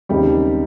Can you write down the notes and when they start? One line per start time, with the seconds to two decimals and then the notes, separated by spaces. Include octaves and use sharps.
0.09 D#2 C#3 G3 G#3 C4 D#4 G4